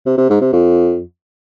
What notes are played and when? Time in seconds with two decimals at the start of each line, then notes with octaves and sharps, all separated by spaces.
0.06 C3
0.18 C3
0.29 G#2
0.41 C3
0.53 F2